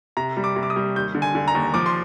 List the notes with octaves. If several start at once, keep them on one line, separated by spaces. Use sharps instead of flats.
C3 A#5
G3
D6
C3
D6
D#6
G3
D#2 G6
D3
G#5
D3
A#5
D#2
F3 D6
C6